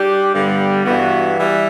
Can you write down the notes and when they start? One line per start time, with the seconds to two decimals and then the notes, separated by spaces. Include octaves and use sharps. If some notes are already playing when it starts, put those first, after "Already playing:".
Already playing: G3 D4 G4
0.33 G2 D3 G3 B3
0.85 G2 E3 B3 F#4
1.38 E3 G3